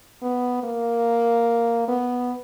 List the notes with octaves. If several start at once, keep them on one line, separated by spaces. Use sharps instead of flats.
B3
A#3
B3